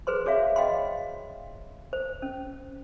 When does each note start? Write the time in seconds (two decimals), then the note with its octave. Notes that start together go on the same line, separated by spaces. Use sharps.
0.07 G#4 B4 C5 C6
0.26 F#4 G#4 C#5 E5 F5
0.56 D#5 F5 G5 B5 C6
1.93 C5
2.22 C#4